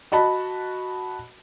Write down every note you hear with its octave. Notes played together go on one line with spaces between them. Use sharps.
F#4 D#5 A5 B5